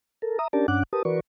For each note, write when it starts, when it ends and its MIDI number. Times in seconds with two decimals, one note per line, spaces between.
0.22 0.38 69
0.22 0.38 70
0.39 0.48 76
0.39 0.48 82
0.39 0.48 87
0.53 0.67 61
0.53 0.67 62
0.53 0.67 67
0.53 0.67 70
0.53 0.67 74
0.53 0.67 81
0.68 0.83 43
0.68 0.83 61
0.68 0.83 62
0.68 0.83 78
0.68 0.83 86
0.68 0.83 90
0.93 1.02 67
0.93 1.02 70
0.93 1.02 71
0.93 1.02 81
0.93 1.02 87
1.05 1.20 52
1.05 1.20 66
1.05 1.20 70
1.05 1.20 71
1.05 1.20 74
1.05 1.20 85